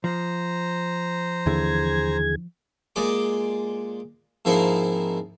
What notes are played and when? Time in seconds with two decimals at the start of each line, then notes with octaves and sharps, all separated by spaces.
0.04 F3 C5 A#5
1.46 D#2 D3 E3 G#4 G#6
2.96 A#2 G#3 D5 D#5 D6
4.45 G#2 F3 A#3 C4 D#4 E4